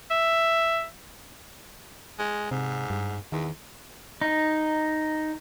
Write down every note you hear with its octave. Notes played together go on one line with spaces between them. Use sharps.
E5
G#3
G#2 C3
G2
E2 D#3
D#4